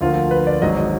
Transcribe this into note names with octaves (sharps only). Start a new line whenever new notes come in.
D2 D3 F3 A#3 F4
B4
D5
G#1 G#2 F#3 D#5
D#5